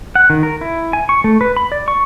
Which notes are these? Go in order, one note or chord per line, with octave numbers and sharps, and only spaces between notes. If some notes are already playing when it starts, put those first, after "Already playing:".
F#5
D#3
A#4
E4
G#5
C#6
A3
B4
B5
D5
C#6